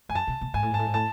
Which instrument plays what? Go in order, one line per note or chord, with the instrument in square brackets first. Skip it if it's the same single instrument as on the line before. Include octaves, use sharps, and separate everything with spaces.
[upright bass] G#2 [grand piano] G#5
[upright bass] F#2 [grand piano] A5
[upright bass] B2
B2
[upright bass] G#2 [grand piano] G#5
[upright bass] A2
G#2
[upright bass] A2 [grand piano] A5
[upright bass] G#2
[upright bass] A2 [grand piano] A5